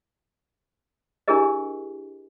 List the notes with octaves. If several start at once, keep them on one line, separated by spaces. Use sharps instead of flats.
D4 E4 G4 G#4 A#4 D#5